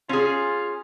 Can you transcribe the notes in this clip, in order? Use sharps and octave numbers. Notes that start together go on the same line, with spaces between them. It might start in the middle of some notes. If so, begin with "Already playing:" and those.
C#4 F4 G#4